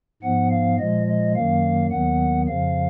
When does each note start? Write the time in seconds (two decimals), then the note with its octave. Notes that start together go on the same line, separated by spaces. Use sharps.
0.23 G#2 F3 B3 F#5
0.50 F5
0.79 A#2 F3 G#3 D#5
1.07 D#5
1.35 F#2 D#3 F#3 A#3 F5
1.91 D#2 D#3 F#3 B3 F#5
2.48 F2 C#3 F3 F5